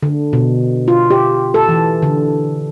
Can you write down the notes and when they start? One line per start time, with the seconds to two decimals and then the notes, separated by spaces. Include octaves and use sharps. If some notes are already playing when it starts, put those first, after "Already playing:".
0.03 D3
0.33 B2
0.88 F4
1.10 G4
1.54 A4
1.69 E3
2.02 D3